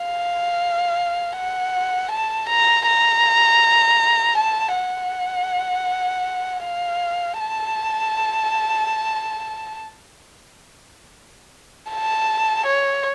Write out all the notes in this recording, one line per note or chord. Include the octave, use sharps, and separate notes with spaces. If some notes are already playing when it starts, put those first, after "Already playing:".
Already playing: F5
F#5
A5
A#5
A#5
A5
F#5
F5
A5
A5
C#5